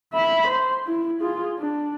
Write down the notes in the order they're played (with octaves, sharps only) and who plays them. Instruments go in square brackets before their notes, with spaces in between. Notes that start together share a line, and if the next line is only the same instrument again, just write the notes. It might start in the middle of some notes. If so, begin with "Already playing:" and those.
[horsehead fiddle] E5 B5
C5
E4
F4 G#4
D4